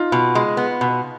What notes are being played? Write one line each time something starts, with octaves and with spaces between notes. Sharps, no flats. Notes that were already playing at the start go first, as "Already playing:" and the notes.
Already playing: D#4 F4
B2
G#3
B3
B2